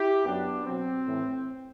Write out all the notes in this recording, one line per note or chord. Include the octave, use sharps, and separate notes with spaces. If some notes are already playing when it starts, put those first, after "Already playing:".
Already playing: E4 G4
F#2 F#3 B3 D4
B2 F#3 C4
A2 E3